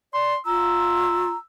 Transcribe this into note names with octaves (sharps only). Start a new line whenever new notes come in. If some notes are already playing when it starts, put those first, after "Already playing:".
D5 C6
F4 A#5 E6